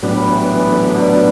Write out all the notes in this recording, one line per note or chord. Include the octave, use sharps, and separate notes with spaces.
A2 F#3 G3 B3 D4
E3
E3
D3
B2